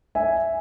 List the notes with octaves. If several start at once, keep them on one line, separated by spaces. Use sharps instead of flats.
E5 G#5